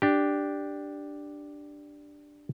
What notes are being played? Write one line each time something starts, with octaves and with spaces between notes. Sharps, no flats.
D4 G4